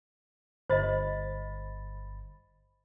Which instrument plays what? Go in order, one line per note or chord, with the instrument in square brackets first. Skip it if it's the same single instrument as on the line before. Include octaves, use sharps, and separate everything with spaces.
[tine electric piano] G1 B5 A6 [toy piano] C5 D#5